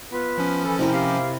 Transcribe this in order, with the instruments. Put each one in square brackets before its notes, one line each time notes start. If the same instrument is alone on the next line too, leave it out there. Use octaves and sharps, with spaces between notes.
[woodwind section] B3 F4 B4
[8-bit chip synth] F3 C#4
[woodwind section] E3 A4
[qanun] C3 E4 A#4 [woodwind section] C4
[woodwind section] G4 F5